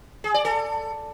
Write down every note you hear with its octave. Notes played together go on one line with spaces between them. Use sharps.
G#4
D5
A4